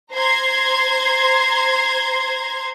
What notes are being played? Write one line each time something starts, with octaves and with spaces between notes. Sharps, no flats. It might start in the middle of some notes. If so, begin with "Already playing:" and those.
C5 A#5 C6 G#6